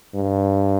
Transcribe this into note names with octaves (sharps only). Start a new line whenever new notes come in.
G2